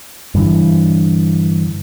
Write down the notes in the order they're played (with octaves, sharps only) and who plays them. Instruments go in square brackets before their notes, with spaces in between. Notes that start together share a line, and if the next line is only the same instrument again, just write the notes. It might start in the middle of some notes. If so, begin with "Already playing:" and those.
[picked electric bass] G2 D3 E3